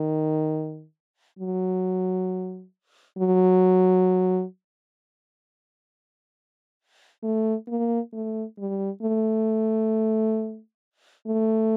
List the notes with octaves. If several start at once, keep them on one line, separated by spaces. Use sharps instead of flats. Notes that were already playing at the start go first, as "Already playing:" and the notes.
Already playing: D#3
F#3
F#3
A3
A#3
A3
G3
A3
A3